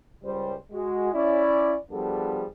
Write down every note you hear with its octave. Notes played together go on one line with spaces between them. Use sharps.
C#2 G3 C5
G#3 F#4
C#4 E4 D5
F3 G3 B3 D4 G#4 A4